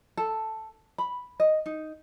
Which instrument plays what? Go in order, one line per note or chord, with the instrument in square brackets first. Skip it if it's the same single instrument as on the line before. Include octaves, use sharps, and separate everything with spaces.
[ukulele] A4
B5
D#5
D#4